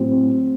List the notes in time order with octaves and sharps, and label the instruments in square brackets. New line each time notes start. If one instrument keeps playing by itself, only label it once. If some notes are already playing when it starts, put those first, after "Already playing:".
Already playing: [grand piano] A2 F#3 C4